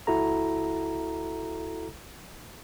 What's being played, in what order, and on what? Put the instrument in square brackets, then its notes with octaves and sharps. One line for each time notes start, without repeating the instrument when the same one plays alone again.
[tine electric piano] C#2 E4 F#4 A4 A#5